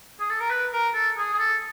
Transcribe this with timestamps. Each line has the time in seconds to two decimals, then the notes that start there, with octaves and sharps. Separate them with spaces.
0.20 G#4
0.30 A4
0.41 A#4
0.51 B4
0.73 A#4
0.94 A4
1.18 G#4
1.34 G#4
1.39 A4